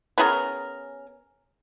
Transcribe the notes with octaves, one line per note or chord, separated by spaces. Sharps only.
B3 C#4 G#4 A#4